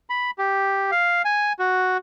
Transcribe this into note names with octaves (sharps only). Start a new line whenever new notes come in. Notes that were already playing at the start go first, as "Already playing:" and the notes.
B5
G4
F5
G#5
F#4